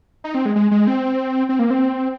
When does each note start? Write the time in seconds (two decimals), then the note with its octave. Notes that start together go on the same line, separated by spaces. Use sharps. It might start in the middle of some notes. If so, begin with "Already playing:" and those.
0.24 D#4
0.35 C4
0.46 G#3
0.56 G#3
0.71 G#3
0.87 C4
1.49 C4
1.59 A#3
1.70 C4